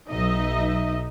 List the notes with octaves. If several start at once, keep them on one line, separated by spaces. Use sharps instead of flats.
B1 D#4 D#5 E5